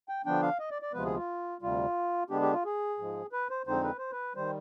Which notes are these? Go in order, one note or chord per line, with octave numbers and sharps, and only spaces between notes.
G5
D3 F3 B3 D4 G5
F5
D#5
D5
D5
D2 C3 F3 G#3 B3 B4
G#4
F4
D2 C3 G3 F4
D3 G#3 B3 D4 G4
G4
F4
G#4
G#2 F3 G#3
B4
C5
F2 D3 G#3 C4 D#4 C5
B4
C5
B4
D#3 G3 C5